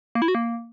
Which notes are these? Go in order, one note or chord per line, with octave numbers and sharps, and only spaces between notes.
A#3
E4
F#4
A#3